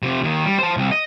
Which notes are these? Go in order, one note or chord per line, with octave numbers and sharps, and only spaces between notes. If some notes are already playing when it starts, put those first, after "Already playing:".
C3 F3
D#2 D#3
G3
C5 A5
C2
D#5